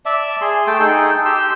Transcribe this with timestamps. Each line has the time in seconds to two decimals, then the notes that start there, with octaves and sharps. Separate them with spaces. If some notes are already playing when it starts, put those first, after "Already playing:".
0.06 D5 E5 A5
0.41 G#4 C6
0.67 A3 G5 A5
0.80 D#4 G#4 A4 G5
1.25 G4 C6 E6